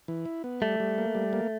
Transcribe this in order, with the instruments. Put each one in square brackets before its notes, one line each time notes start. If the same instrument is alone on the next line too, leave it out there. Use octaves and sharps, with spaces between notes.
[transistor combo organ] E3
E4
B3
[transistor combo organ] G3 [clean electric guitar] A3
[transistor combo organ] G3
A#3
G3
A#3